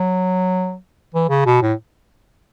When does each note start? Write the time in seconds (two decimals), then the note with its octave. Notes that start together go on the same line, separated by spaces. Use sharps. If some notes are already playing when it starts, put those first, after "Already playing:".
Already playing: F#3
1.15 E3
1.30 C#3
1.46 B2
1.62 A2